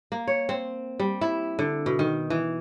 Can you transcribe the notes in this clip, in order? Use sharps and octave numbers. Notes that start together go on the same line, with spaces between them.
A#3
C#5
C4
G3
E4
D3
B2
D#3
E3